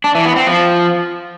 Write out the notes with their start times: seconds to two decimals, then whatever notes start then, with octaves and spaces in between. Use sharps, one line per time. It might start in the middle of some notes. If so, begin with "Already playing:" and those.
0.04 D4
0.15 E3
0.25 B3
0.36 C4
0.47 F3